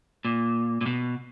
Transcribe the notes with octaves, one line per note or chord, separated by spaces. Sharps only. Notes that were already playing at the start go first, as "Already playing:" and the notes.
A#2
A#2
B2